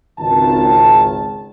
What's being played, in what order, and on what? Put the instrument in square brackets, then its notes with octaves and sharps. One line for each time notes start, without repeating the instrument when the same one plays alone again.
[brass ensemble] G#1 C#2 D#3 A5